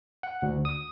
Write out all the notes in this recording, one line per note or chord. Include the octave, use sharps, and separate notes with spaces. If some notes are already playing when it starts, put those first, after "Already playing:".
F#5
D2
D#6